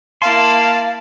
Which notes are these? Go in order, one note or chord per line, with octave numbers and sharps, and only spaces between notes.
A#3 E4 F5 A5 C6